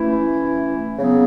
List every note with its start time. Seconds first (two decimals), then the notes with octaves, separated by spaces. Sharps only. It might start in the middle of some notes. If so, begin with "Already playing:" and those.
Already playing: E3 A3 C#4 E4
0.99 C#3 F#3 B3